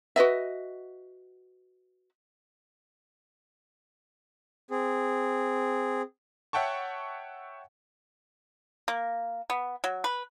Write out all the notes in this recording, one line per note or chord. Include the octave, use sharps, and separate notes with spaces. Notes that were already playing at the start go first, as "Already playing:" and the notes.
F#4 B4 D#5 E5
C4 G#4
C#5 E5 F#5 G5 A5 C#6
A#3
B3
F#3
B4